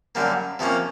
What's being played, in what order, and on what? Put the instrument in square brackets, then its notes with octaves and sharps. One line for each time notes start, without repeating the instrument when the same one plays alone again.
[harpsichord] F#2 D3 G3 A#3
C3 F3 A#3 C#4